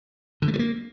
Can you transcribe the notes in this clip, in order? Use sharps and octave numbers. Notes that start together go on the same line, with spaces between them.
D3
A3
G3
A#3